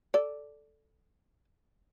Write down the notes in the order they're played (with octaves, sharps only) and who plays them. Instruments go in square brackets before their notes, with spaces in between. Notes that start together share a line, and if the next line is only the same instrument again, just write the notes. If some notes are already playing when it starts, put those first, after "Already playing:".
[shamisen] A4 D5